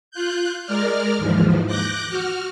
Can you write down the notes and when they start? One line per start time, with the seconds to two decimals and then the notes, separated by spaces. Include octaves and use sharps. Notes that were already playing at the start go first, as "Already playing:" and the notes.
0.11 F4 F#6 G6
0.66 G#3 A#4 D5 F6
1.18 D#2 G#2 E3 F3
1.66 D6 F#6 G6 A#6
2.09 F#4 F6